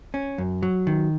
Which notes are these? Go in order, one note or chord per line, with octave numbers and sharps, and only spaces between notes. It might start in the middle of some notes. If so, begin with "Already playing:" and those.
C#4
F#2
F#3
D#3